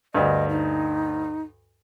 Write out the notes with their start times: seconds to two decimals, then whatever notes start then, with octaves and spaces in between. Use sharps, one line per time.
0.15 D2 G2 D#5
0.49 D#4